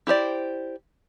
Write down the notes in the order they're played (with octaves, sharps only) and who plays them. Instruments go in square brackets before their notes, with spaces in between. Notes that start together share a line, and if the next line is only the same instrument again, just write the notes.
[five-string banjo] E4 G4 C5 D5